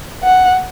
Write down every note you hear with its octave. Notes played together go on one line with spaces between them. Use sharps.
F#5